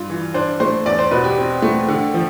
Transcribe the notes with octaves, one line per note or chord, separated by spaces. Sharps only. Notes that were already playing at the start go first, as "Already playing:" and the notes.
Already playing: G2 F4
E3
D4 C5
A3 C5
E2 D5
C5
B2 B4
G4
C4
A3
D3
F3